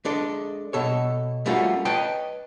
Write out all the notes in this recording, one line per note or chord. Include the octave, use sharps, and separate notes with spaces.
G#3 D4 A4
B2 A4 C#5
G3 A3 A#3 C#4 F4 F#4
B4 C#5 D#5 G5 A5